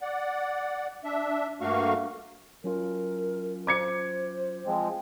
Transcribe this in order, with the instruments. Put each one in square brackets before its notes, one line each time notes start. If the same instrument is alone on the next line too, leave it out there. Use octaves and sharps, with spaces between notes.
[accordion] D5 F#5
D4 E5
G2 A3 A#3 F#4 F5 C#6
[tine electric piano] F#3 C#4 F4 [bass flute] A#4
[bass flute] C5 [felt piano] D6 G#6 C#7
[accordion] F3 G#3 C4